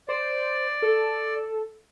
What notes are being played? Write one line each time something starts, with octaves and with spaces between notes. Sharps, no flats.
C5 D5
A4